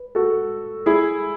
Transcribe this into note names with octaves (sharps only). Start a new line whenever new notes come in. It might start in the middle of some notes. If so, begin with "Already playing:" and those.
Already playing: B4
F#4 A4
E4 G#4